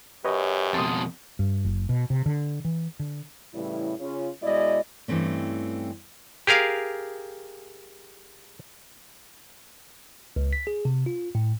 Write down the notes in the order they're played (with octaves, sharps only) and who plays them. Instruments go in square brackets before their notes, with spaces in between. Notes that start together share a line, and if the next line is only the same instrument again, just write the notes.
[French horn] F#2 [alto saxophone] G4 [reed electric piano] B4 C#5 D#5
[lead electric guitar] F2 B2 [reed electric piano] A5 C6 D#6
[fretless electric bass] G2
F#1
B2
C3
D3
E3
D3
[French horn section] A2 C#3 E3 G3 E4
C#3 C#4 F4
B2 G#3 E4 D5 D#5
[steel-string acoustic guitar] G2 E3 A3 C4 C#4
[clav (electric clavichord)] G4 G#4 A#4 F5
[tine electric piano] C#2
B6
G#4
C3
F4
A2